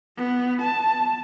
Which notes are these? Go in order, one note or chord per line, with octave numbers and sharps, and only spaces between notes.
B3
A5